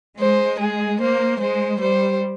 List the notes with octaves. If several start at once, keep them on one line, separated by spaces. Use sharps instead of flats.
G#3 C5
G#4
A#3 C5
G#3 C5
G3 C5